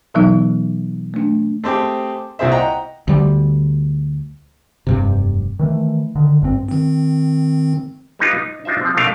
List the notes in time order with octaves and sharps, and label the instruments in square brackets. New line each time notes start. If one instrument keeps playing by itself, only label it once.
[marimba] B2 E3 F#3 B3 D#4
A3 D4
[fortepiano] A3 C4 G4 G#4
C2 A#2 C4 G#4 C5 E5
D#5 F#5 G5 A#5
[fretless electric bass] D2 G3
F1 G2 C3
[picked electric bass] D#3 E3 A3
D3 D#3
G#1 G2 B2 C4
[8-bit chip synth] D#3 C4
[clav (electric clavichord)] G3 B3 D#4 F4
D#4
D4 D#4 F4 C5 E5
F3 C4
B2 A3 D4 D#4 A#4 F5